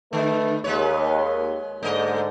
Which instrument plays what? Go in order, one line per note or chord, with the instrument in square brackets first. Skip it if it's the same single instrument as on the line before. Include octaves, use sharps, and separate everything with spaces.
[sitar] D3 [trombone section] A3 B4
[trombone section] D#2 [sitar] G#3 B4 C#5
[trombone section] G#2 D3 [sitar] A3 D#5